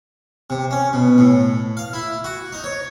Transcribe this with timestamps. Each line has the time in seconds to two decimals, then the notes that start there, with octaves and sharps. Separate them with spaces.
0.50 C3
0.71 C#4
0.93 B2
1.18 A2
1.77 F5
1.93 E4
2.24 F#4
2.52 D#4
2.64 C#5